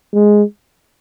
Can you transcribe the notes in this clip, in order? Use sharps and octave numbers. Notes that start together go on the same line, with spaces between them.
G#3